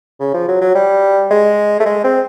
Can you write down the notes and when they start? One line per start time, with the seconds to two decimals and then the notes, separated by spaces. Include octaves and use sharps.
0.20 C#3
0.34 F3
0.48 F#3
0.61 F#3
0.75 G3
1.31 G#3
1.80 A3
1.86 G#3
2.04 C4